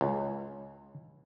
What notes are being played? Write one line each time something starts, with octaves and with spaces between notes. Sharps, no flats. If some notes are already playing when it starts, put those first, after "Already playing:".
C#2